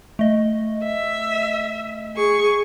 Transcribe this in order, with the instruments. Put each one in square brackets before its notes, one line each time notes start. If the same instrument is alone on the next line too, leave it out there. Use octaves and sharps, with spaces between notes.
[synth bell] A3 D#5
[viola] E5
G#4 C#6